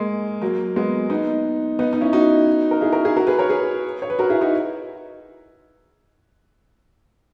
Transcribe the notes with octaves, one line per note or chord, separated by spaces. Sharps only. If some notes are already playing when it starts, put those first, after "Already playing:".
Already playing: G#3 A#3
F#3 A#3
G#3 B3
B3 D#4
B3 D#4
D#4
C#4 E4
D#4 F#4
A#4
E4 G#4
F#4 A#4
E4 G#4
F#4 A#4
G#4 B4
A#4 C#5
G#4 B4
C#5
B4
F#4 A#4
E4 G#4
D#4 F#4